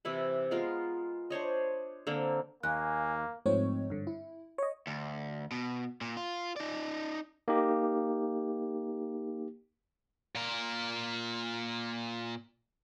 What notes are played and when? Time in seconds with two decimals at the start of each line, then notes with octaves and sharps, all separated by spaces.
0.05 C3 E3 E4 B4
0.51 G#3 B3 F4 A#4
1.30 D4 C5 C#5 D#5
2.07 D3 A#3 C4
2.63 D#2 A#3 F5 G#5 F#6
3.46 G#2 F3 A3 C4 D#4 C#5
3.90 G2 D3
4.07 E4
4.58 C#5 D#5
4.87 D2
5.51 B2
6.01 A#2
6.17 F4
6.56 D#4 D5
7.48 A#3 D#4 G4
10.35 A#2 A#4